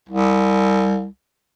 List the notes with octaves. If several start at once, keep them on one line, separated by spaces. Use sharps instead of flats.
C2